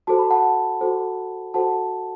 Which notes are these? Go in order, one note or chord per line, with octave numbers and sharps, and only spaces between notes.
F#4 A4 C5 A5
B5
F#5 A5
F#4 A4 C5
F#4 A4 C5 F#5 A5